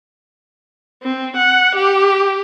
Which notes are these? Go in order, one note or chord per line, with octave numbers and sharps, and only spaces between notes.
C4
F#5
G4